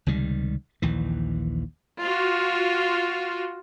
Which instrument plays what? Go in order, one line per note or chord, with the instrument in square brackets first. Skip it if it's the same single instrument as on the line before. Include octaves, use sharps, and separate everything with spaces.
[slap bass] C#2 C3 D#3 G3
A#1 D#2 E3
[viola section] F4 F#4